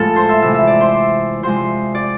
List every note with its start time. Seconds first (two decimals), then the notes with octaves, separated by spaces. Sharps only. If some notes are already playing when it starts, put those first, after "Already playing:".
Already playing: A2 F3 G#3 F4 A4
0.16 C5
0.29 E5
0.42 C3 E3 G#3 E5
0.55 E5
0.67 D5
0.80 C5
1.43 C3 F3 G#3 C5
1.95 D5